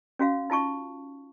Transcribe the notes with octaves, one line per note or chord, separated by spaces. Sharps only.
C#4 F#4 F5
D#4 F4 A5 C#6